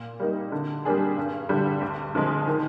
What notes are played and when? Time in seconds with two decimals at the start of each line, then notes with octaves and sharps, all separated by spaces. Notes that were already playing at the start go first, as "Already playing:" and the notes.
Already playing: A#2
0.20 G3 A#3 D#4
0.52 D3
0.85 G3 A#3 D4 G#4
1.17 G2
1.49 D3 G3
1.81 D2
2.15 D3 F3 G#3
2.47 D#3